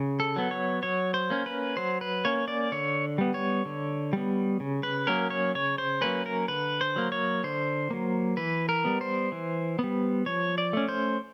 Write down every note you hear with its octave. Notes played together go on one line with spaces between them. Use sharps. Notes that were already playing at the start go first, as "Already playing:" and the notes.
Already playing: C#3
A4
F#3 B3
C#5
F#3 C#5
C5
A#3 C#4
B4
F#3 C5
B4
A#3 C#4 C#5
D5
D3 C#5
G3 B3
C#5
D3
G3 B3
C#3
B4
F#3 A#3 C#4 A#4
C#5
C#3 C#5
C5
F#3 A#3 C#4 B4
A#4
D3 B4
C5
F#3 A#3
C#5
D3 C5
F#3 A#3
E3 B4
A#4
G3 B3
C5
E3
G3 B3
F3 C#5
D5
A3 C#4
C5